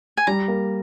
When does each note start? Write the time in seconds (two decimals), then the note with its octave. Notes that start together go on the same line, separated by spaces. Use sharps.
0.17 G#5
0.27 G3 A#5
0.48 A#3